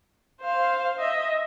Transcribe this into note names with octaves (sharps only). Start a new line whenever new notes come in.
C5 F5
D#5 E5